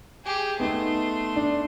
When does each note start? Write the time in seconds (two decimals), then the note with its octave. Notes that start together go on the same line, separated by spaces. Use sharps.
0.25 G4 G#4
0.60 A3 B3 D#4 C6
1.36 D4